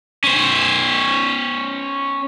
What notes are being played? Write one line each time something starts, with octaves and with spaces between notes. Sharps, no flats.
C#4 C5